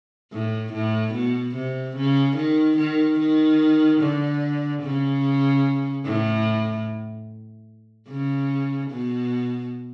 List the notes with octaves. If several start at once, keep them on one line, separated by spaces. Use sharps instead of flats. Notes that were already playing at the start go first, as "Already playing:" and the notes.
A2
A2
B2
C3
C#3
D#3
D#3
D#3
D3
C#3
A2
C#3
B2